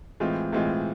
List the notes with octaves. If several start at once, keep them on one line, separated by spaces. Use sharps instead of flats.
A2 E3 G#3 C4 F4
A2 E3 G#3 C4 F4